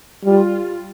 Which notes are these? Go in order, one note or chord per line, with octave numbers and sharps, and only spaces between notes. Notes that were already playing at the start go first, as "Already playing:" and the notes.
G3 F4